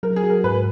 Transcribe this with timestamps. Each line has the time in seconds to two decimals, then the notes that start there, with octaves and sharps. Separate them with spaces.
0.03 F#3 A#4
0.16 G#4
0.23 F#4
0.30 A#4
0.44 G#2 B4